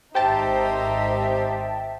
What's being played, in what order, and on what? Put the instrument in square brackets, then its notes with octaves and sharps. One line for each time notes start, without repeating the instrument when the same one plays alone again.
[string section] G#1 D#4 [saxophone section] G4 C5 [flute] E5 [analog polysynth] G5 A5